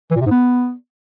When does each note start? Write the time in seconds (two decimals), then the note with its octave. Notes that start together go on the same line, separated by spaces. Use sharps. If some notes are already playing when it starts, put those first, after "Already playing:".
0.11 E3
0.16 A#2
0.21 C3
0.26 G#2
0.31 B3